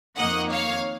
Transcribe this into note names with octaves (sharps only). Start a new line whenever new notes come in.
F2 D#3 A#3 D#5 F#5
C#5 F5